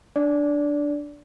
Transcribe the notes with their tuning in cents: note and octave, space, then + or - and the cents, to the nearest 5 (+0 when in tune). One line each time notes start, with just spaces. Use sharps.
D4 +0 D5 -20